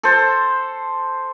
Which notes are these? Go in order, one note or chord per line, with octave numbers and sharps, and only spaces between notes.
A4 C5